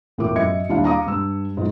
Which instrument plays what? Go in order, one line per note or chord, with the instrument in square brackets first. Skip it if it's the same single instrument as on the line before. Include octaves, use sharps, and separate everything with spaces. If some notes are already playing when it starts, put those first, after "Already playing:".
[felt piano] E1 A2 F4 A#4 D6
F#2 D#5 E5 G#6 C#7
D#2 G3 D4 E4 F5
F5 A#5 D6 D#6
G2 E6
G#2 F#3 D#4 F4